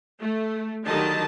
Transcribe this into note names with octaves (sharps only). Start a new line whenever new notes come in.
A3
D3 D#3 F#3 G4 D#5 A5